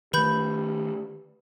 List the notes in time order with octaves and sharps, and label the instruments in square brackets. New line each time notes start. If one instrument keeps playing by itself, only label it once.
[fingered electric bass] D#3 A3 [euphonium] G4 [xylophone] B4 B5 G6